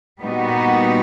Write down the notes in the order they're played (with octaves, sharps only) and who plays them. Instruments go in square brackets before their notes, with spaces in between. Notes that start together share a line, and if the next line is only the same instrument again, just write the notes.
[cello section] A#2 G3 B3 D#4 F#4